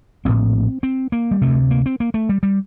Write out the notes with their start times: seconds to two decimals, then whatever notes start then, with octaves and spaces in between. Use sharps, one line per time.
0.25 A#1 A2 C4
0.83 C4
1.12 A#3
1.31 G3
1.41 D2 C3 A3
1.71 A#3
1.86 C4
2.00 A#3
2.14 A3
2.29 G3
2.43 G3